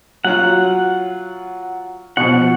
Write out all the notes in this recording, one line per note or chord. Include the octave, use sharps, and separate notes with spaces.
F#3 F4 F#5
B2 F3 F#5